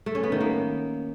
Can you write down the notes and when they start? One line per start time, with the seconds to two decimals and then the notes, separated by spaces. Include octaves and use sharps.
0.06 A3
0.15 C#4
0.23 B3
0.32 D#3
0.41 A#3